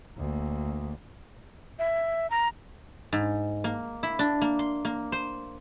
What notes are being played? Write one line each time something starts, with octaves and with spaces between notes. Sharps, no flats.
D2 A#3
E5
A#5
G#2
A#3
E4
D4
A#3
C6
A#3
C5